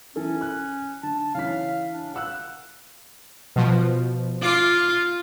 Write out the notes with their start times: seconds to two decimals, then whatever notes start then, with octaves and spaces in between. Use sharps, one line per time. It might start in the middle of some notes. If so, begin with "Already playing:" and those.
0.16 E3 C#4 A4
0.41 F#6
1.03 D3 A5
1.35 C#3 E3 F5 B6
1.93 D4
2.14 F5 F#5 E6 F#6
3.56 B2 F3
4.42 F4 D6 C7